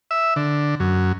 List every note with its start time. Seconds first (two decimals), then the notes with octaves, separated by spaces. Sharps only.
0.11 E5
0.36 D3
0.80 F#2